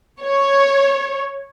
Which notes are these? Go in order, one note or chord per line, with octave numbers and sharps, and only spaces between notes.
C#5